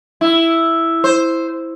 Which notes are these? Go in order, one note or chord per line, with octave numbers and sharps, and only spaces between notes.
E4
C5